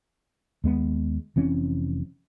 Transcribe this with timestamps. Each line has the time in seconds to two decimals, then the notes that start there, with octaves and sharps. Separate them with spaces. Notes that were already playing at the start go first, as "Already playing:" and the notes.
0.64 D#2 G#3 B3
1.36 F1 E3 C4 C#4